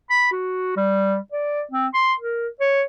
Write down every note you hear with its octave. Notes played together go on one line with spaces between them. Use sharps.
B5
F#4
G3
D5
C4
C6
A#4
C#5